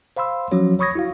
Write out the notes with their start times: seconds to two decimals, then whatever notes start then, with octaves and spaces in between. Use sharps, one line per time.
0.17 C5 F5 B5 C6 E6
0.51 F3 F#3 C#4 F#4 C#5
0.79 C#5 B5 C#6 D#6 G#6 A#6
0.95 E4 F#4 F5